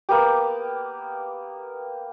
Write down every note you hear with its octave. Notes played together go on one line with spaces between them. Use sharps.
A#3 B3 G4